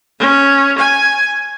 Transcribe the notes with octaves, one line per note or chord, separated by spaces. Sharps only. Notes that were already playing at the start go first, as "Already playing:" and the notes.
C#4
G#5